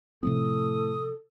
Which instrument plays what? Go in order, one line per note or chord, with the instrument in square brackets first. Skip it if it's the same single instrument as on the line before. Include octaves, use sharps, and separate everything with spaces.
[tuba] A2 [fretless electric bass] C3 F3 C4 [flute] A4 [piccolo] D#6